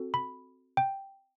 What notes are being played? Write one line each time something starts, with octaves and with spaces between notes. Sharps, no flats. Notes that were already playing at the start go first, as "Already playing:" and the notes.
Already playing: C4 F#4 A4
B5
G5